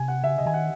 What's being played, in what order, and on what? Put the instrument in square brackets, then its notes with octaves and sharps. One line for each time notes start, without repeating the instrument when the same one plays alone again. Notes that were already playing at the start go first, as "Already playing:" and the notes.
Already playing: [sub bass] C3 [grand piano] G#5
[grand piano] F#5
[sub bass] C#3 [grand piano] E5
[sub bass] C#3 [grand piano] D#5
[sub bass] D#3 [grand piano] G#5
[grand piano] F#5